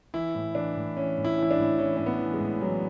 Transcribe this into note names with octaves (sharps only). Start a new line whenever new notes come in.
E3 E4
A2
E3 D4
A2
E3 C#4
A2
E4
E3 E4
D4
A2
E3 C#4
A2 C#4
B3
E3
G#3
A2
E3 F#3